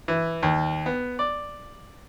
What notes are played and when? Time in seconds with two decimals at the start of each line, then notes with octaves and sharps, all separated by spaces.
0.08 E3
0.43 D#2
0.86 B3
1.19 D5